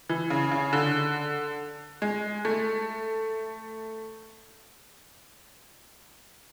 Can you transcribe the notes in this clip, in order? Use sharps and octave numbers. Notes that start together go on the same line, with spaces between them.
E3
C#3
C#3
D3
G#3
A3